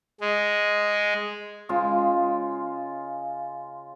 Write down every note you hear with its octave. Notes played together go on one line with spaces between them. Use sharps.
G#3
C#3 G#3 F4